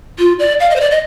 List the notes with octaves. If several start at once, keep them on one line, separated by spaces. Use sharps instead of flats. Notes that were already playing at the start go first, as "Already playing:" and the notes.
F4
D5
F5
D#5
C5
D5
D#5